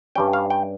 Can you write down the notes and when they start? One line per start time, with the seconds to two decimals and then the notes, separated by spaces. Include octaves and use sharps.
0.15 G2 G3 C#4 G5
0.33 F5
0.50 G5